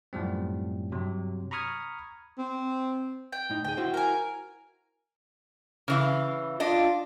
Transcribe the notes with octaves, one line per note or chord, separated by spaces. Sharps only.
F#2 A2 F3 G3 C4
G2 C3 F#3
A#5 B5 C#6 D#6 F6 G#6
C4
G5
A2 D#4
D2 G#4 G5
E4 F#4 C5
A#4 G#5
C#3 E3 F5
D4 F4 D#5